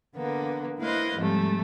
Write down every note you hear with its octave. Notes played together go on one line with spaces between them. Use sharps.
D3 A#3 B3
A#3 E4 B4 C5 D#5 F5
G#2 C3 F3 G3 A3